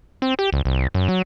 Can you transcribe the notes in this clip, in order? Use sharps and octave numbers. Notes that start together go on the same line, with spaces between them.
C4
G4
C#2
C2
F#2
F#3